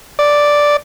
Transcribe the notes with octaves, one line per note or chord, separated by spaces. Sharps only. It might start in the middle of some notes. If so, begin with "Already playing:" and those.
D5